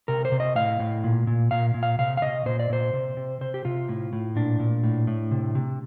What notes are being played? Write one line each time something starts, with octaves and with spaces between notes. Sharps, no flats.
C3 A#4
C5
C3
D#5
A2 F5
A2
A#2
A#2
A#2 F5
A#2
F5
C3 F5
F5
C3 D#5
A#2 C5
D5
A#2 C5
C3
C3
C3 C5
G4
C3 F4
A2
A2
A#2 D4
A#2
A2
A2
C3
C3